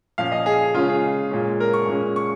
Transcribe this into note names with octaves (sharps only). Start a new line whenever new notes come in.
A#2 F3 C#4 F5
D#5
G#4
C#3 G#3 C#4 F4
G#4
A#2 G#3 C#4
A#4
C#6
A#2 G#3 C#4
C#6